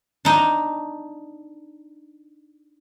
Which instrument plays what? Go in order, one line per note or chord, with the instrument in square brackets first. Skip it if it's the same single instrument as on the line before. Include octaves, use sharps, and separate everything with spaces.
[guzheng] D4 D#4